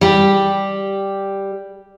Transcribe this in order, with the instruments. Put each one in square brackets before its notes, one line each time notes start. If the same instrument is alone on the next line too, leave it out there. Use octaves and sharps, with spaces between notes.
[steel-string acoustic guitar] G3 G4